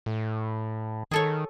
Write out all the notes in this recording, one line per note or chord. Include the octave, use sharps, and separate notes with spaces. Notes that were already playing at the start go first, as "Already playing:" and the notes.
A2
D#3 G#4 A4 C#5